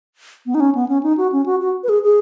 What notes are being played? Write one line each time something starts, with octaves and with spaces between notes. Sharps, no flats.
B3
D#4
C#4
B3
C#4
D#4
F#4
C#4
F#4
F#4
B4
G#4
G#4